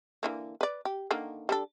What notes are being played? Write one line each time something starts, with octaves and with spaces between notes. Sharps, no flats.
D3 E3 A#3
B4 D5
G4
D3 D#3 A#3
G3 D4 A4